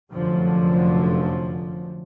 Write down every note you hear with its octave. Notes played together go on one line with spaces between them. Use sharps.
F1 F#2 D3 F3